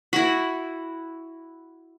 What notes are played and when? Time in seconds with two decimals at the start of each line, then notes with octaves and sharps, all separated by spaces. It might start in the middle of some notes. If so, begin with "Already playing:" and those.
0.13 E4 F#4